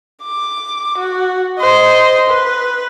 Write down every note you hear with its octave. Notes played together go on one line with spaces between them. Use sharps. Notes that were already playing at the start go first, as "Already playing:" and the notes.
D6
F#4
C5 D#5
B4